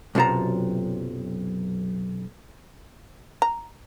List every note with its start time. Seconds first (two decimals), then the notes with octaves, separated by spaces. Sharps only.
0.15 B1 F#2 C3 F4 A5 A#5
3.42 A#5